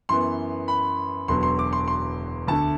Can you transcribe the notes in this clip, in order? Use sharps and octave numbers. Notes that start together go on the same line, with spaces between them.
F#2 E3 B3 C6
B5
E1 E2 D3 F#3 B3 C6
C6
D6
C6
C6
D2 D3 A3 A5